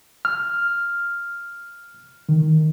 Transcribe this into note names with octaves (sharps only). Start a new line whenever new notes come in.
F6
D#3